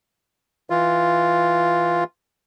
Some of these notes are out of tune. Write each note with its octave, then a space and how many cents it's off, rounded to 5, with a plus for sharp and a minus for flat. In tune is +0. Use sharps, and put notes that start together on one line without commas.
E3 +0 F4 +0